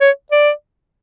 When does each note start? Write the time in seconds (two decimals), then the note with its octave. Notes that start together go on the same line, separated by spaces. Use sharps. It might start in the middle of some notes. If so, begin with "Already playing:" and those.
0.01 C#5
0.32 D5